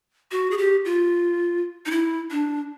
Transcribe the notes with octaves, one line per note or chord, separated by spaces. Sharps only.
F#4
G#4
G4
F4
D#4
E4
D4